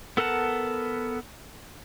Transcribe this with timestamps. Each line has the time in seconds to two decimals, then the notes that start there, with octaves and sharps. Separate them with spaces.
0.17 B3 A4 A#4 F#5 A5